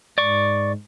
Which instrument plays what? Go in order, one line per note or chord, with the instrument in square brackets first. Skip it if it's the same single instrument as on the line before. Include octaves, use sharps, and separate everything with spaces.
[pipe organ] G#2 [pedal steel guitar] D5 C#6